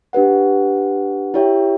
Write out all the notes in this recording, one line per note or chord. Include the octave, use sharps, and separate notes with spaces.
D4 G4 B4 F#5
E4 G4 C#5 E5 G5